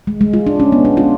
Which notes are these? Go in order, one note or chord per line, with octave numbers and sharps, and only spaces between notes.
G#3
G#3
F4
D4
C#4
B3
D4
F4